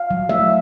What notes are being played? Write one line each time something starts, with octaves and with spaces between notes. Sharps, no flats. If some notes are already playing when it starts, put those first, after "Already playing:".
Already playing: F5
F#3
A3 E5